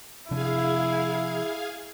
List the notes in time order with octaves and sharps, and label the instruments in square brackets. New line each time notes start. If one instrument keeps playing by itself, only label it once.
[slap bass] C3 F3 D4 [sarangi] E4 [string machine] G#4 F5 G#5